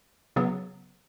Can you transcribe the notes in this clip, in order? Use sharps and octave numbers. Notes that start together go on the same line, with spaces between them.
C#3 F#3 B3